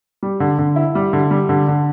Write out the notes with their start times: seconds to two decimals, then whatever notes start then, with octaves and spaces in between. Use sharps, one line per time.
0.23 G3
0.40 D3
0.59 D3
0.76 E4
0.95 G3
1.13 D3
1.31 G3
1.49 D3
1.68 D3